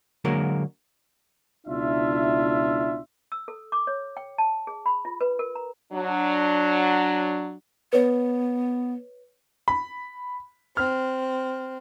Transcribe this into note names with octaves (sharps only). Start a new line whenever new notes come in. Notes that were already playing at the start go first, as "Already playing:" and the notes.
D3 F#3 G#3 A#3 F#4 A#4
C#2 B2 D4 E4 F4 E5
E6
A4
D6
C#5
G5
A5
G#4
B5
F4
B4
A#4
A#5
F#3 D4
B3 B4 C#5
B5
C4 F6